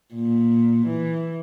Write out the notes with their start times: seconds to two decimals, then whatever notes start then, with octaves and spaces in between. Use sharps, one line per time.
0.14 A#2
0.87 E3